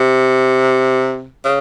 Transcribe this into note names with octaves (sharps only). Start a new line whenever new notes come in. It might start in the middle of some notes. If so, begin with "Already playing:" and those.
Already playing: C3
C#3